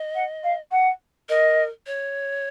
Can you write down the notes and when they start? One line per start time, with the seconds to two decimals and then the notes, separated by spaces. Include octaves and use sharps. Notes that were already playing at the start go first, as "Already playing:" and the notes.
Already playing: D#5
0.15 F#5
0.43 F5
0.71 F#5
1.29 A#4 D#5
1.87 C#5